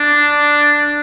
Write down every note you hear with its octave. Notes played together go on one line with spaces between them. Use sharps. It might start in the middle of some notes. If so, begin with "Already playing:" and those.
Already playing: D4